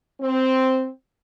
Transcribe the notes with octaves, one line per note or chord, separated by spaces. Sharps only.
C4